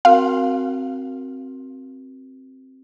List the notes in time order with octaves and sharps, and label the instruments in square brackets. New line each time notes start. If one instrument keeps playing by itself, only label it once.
[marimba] C4 F#4 A#4 [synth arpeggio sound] F5